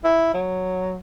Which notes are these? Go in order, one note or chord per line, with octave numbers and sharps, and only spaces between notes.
E4
F#3